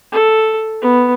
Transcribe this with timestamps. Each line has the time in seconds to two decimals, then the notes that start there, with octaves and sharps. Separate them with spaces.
0.12 A4
0.82 B3